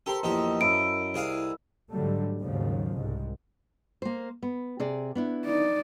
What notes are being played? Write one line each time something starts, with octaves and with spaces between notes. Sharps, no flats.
G4 A4 A#4 C5 C6
A#1 E2 G4 D#5
F#2 E4 D7
C2 G#4 F5
G#2 D3 F#3 G3 A3
D#2 G#2 C#3 F3 F#3
C2 G#2 G#3
A#3 C5
B3
C3 G#4 D5
B3 D4 E4
D#4 D5